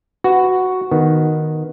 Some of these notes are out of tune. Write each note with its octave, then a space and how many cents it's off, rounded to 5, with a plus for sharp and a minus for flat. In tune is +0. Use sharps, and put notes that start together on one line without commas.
F#4 +0 B4 +15
D#3 +0 B3 +0